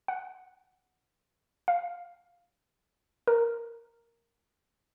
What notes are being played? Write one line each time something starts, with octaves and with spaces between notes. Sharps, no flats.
F#5
F5
A#4